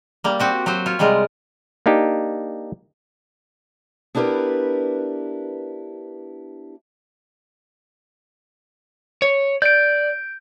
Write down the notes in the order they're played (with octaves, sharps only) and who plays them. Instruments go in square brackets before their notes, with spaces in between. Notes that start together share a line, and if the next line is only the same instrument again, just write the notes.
[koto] G3 A#3
C4 F#4 G4
F#3 F#4 G4 C5
F4 C#5
C3 G3 G#3 F4 A#4
[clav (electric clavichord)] A#3 D4 D#4 G4
[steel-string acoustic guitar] B3 D4 E4 G4 A#4 B4
[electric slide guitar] C#5
[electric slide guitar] D5 [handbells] G6 D7